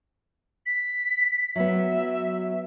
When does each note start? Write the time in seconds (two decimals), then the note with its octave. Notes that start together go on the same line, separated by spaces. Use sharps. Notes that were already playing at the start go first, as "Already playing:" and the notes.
0.66 B6
1.56 F#3 B3 E5